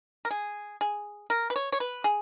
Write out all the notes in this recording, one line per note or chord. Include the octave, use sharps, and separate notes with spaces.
A#4
G#4
G#4
A#4
B4
C#5
C#5
B4
G#4